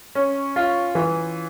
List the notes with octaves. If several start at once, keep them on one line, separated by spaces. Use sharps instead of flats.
C#4
F4
E3